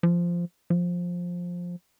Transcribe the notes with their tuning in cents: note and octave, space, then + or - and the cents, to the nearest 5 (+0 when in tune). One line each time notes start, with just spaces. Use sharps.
F3 -10
F3 +10